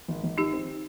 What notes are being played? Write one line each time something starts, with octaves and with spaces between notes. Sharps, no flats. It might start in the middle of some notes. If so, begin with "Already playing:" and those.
G#1
G#1
F3 D#4 G4
C4